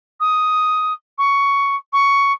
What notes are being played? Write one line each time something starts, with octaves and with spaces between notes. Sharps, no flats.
D#6
C#6
C#6